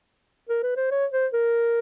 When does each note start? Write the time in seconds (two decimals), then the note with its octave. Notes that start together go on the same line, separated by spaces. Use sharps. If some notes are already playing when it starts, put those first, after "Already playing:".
0.49 A#4
0.63 B4
0.77 C5
0.91 C#5
1.12 C5
1.33 A#4